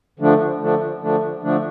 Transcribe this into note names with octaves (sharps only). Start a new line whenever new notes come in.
D3 F3 A3 D4
D3 F3 A3 D4
D3 F3 A3 D4
D3 F3 A3 D4